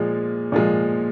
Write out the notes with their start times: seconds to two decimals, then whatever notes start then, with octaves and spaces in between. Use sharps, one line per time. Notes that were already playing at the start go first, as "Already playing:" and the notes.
Already playing: A#2 F3 G#3
0.52 A#2 F3 G#3